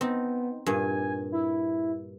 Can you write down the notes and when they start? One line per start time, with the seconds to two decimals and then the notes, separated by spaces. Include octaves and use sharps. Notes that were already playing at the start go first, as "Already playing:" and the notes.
0.01 B3 C4 D#4
0.66 G2 A#2 G#5
1.32 E4